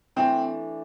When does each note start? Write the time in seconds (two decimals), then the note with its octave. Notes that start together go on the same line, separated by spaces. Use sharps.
0.16 E3 A3 C4 D4